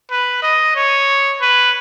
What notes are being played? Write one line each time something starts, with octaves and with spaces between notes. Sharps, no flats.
B4
D#5
C#5
B4